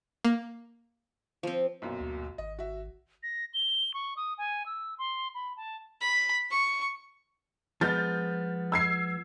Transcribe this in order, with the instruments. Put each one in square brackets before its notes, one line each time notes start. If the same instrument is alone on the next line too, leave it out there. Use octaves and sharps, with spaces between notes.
[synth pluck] A#3
[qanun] F3 C4
[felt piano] B1 F#2 A#2
[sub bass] D2
[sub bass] G#1 [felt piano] D#5
[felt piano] F#4 E5
[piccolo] A#6
G7
C#6
D#6
G#5
E6
C6
B5
A5
[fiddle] B5
C#6
[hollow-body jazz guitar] F3 G#3 B3 [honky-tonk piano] F6 G6 A6
[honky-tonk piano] E6 G#6 C7